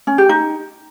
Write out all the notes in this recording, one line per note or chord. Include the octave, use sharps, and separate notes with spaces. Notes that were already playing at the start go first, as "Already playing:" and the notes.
C#4
G4
D#4